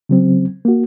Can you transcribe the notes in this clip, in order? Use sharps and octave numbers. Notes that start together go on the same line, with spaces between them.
C#3 F#3 C4
A#3 F#4